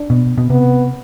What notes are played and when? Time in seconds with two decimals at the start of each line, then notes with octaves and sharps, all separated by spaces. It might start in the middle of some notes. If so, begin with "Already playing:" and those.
Already playing: D4
0.10 B2
0.38 B2
0.50 C3 B3